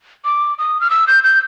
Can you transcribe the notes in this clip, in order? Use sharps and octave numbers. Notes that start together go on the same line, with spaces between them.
D6
D#6
F6
E6
G6
G6